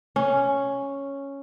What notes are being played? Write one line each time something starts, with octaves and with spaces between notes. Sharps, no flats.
C#4